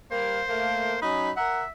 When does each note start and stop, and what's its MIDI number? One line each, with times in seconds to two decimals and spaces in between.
0.11 0.42 55
0.11 0.42 58
0.11 0.99 72
0.49 0.96 57
0.49 0.96 58
1.02 1.30 54
1.02 1.30 61
1.02 1.30 63
1.02 1.32 83
1.37 1.63 70
1.37 1.70 76
1.37 1.63 78